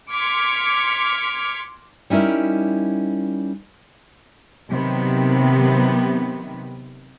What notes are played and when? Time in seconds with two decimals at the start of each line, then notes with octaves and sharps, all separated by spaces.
0.11 C6 D6 F6 G#6 B6 C#7
2.10 G3 C#4 D#4 E4 A#4
4.68 C3 D#3 F#3 B3